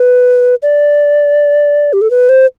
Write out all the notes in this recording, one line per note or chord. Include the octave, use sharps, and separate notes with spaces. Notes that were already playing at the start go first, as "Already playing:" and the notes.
Already playing: B4
D5
G4
A4
B4
C5